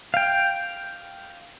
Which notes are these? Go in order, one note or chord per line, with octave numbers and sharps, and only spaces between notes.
F5 G5